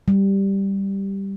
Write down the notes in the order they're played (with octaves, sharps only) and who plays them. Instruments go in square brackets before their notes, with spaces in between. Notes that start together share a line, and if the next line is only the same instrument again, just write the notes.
[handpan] G3